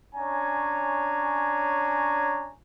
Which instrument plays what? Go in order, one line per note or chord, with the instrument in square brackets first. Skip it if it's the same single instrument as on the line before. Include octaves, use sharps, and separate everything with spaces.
[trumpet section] C#4 D4 C#5 G#5 A#5